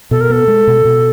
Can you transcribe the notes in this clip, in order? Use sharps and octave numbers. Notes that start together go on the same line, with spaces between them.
B2 A4
A#4
B3 A4
G#3
B2
B2